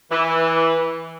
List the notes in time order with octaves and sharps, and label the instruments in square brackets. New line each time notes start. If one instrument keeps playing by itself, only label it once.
[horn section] E3